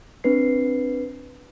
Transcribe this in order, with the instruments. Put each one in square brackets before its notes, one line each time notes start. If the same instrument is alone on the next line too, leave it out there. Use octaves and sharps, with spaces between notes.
[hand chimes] C4 D4 B4 C7